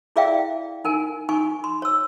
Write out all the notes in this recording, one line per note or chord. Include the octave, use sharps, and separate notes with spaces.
E4 G#4 D5 E5 F5 G5
D#4 A#4 G#5
D#4 G#5 C#6
C6
C#5 E6